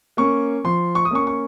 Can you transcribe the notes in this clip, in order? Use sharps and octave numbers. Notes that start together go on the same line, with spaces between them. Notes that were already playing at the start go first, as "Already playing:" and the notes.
A#3 C#4 C#6
F3 C6
C#6
D#6
A#3 C#4 C#6
C#6